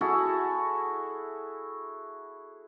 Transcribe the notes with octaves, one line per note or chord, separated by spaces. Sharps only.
E4 F#4 G#4 A4